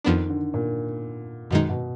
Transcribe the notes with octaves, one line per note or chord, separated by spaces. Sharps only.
F2 D#3 F3 B3 D4
D3
A#2
F#2 B2 D#3 G#3 D#4
B2